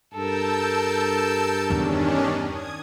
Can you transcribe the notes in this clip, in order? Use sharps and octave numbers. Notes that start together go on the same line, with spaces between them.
G2 A4 A#4 A5 E6 G6
E1 E2 D#3 C#4 D4
D#6 G#6